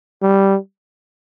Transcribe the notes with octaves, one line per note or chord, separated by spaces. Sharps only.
G3